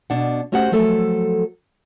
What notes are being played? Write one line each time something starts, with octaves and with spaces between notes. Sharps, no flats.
B2 D4 F#5
A3 C#4 F#4 G4 C5 F#5
F3 F#3 A3 A4